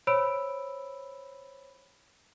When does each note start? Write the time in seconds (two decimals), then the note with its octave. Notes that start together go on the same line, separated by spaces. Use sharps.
0.07 C5 C#5 B5 E6 D7